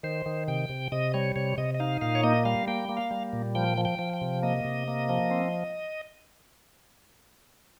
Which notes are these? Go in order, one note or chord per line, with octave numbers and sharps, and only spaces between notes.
D#3 C5
D#3
C3 G5
C3
C3 D#5
G3 C#5
C3 C#5
C3 D#5
D#5
D#4 F5
A#2 F5
C#5
A#3 D#5
G3 F5
A#3 G5
A#3
F5
G3
A#2
F3 G5
F3
G5
F3
G5
C3
A#3 D#5
C3
A#3
F3
C4